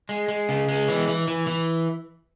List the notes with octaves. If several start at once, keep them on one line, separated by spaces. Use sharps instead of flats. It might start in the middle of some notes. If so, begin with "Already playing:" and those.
G#3
G#3
C#3
G#3
E3
E3
E3
E3